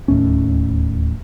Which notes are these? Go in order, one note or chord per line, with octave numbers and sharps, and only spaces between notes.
D1 D#2 A2 C#4